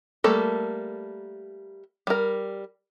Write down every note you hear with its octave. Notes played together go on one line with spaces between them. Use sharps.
G3 A3 A#3 A4
G3 A#4